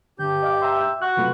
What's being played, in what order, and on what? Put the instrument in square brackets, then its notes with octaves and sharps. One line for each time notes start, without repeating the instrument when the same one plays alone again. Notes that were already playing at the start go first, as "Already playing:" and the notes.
[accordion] G2 G4 G6 [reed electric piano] D3
[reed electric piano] D#5 F5 D6
[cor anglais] E5 [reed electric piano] G5 A#5 C6
[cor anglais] F#4 [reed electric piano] F#6
[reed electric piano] F#2 C3 A3 [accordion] F4 B4